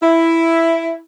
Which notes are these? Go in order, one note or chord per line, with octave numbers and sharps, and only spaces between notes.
E4